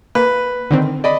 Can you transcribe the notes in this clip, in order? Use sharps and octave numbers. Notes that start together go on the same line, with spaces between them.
A#3 B4
D3 D#3 C4
D5 D#5 B5